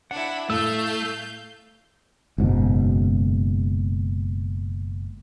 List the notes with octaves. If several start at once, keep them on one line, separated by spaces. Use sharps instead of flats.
D4 E4 F#5
A2 A3 F5 E6 G6
F#1 G#2 B2